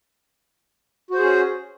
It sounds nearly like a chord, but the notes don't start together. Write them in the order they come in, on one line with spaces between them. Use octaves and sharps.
F#4 C5 G#4 C#4